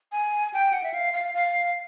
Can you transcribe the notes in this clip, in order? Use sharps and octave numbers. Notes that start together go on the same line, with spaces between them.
G#5
G5
F#5
E5
F5
F5
F5